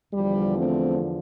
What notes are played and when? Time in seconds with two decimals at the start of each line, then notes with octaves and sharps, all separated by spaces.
0.13 E2 D3 F3 G3
0.58 A3 C4